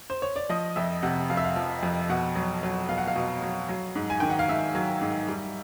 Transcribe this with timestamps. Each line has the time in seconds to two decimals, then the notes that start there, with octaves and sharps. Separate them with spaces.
0.10 C5
0.22 C#5
0.36 D5
0.49 F3 D#5
0.76 F2 E5
1.03 C3 F#5
1.30 F2 F5
1.37 E5
1.44 F5
1.56 F3
1.83 F2
2.09 B2 F#5
2.35 F#3
2.63 F#3
2.88 B2 F5
2.98 F#5
3.08 F5
3.16 B2
3.42 F#3
3.69 F#3
3.95 G#2
4.10 G#5
4.20 D#3 G5
4.30 F#5
4.39 F5
4.49 G#2 E5
4.75 F#3
5.01 G#2
5.28 G3